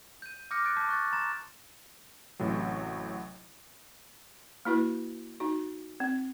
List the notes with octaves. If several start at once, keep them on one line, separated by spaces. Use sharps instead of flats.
G6 D#7
D6 D#6 F6 G6 A#6 C#7
D6 F#6 G6 A6 C#7 D7
A5 D6 D#6 G6 A6 B6
C#6 F#6 G6 A6
A#5 C6 A6 E7
A1 A2 C3 F#3
A#3 E4 F#4 B4
D#4 F#4
C4